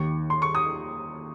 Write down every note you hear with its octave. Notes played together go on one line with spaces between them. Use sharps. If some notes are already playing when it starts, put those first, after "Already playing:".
Already playing: D#2 D#3 C#6
C6
C#6
D#6